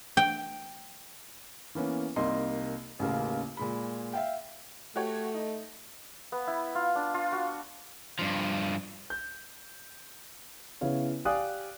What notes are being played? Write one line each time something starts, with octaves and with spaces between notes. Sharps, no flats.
G5
E3 A#3 B3 C#4
C2 C3 A#3 D#4 D#5 C6
A1 D#2 C#3 A#3 F5
A#2 G#3 B5
E5 F5 G5
A3 F#4 G4 C#5
D#4
B3
E4
F4
D4
F4
F#4
G2 F3
G6
C#3 B3 E4 C#5 F5
G4 D5 F5 G#5 D#6 F#6